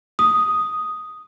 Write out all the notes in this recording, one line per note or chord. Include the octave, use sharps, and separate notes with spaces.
D#6